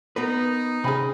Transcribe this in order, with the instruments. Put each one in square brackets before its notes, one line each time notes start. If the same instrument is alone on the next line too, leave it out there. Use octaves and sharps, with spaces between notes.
[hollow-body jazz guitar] B3 A#4 B4 [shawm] D#4
[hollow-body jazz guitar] C3 C#4 [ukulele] G#4 G#5 B5